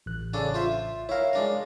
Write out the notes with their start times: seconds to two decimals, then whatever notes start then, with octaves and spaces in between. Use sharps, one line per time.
0.06 A1 F#6
0.34 C#3 D4 A4
0.54 F4 C5 E5
1.09 E4 A#4 C#5 F5
1.33 G#3 D4 A#4